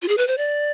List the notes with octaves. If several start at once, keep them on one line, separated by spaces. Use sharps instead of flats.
F4
G#4
B4
C5
D5